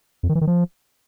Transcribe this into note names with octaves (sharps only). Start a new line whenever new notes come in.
F2
D#3
E3
D#3
F3